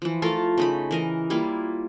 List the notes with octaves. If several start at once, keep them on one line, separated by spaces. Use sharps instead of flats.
E3 F3
A3 F4 A4 A#4
C#3 D#4 B5
E3 A#4 D#5
G3 A#3 E4 F4